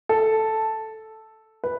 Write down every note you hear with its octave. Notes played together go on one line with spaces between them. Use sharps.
A4
B4